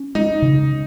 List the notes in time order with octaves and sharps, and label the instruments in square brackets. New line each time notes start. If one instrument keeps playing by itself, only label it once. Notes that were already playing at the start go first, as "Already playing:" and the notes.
Already playing: [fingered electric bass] C#4
[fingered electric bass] G#3 [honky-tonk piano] D#4
[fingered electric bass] C#3